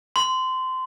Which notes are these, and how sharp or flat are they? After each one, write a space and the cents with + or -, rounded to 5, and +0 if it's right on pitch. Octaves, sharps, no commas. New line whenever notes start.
C6 -20